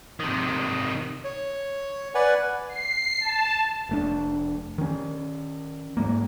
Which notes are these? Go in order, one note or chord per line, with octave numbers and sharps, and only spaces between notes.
C3 D#3
C#5
B4 D5 F#5 G#5
C7
A5
F1 A3 D4
D#3 C#4
G#2 G3 A#3